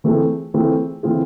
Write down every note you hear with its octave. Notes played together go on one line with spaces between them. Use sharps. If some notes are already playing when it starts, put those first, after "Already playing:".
E3 A3 C4 F4 G#4
E3 A3 C4 F4 G#4
E3 A3 C4 F4 G#4